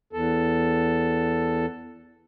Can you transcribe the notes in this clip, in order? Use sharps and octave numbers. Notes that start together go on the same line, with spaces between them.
E2 A4